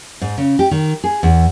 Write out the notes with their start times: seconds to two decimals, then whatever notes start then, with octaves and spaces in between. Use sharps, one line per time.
0.21 G#2
0.38 C#3
0.59 G4
0.71 D#3
1.04 G#4
1.23 E2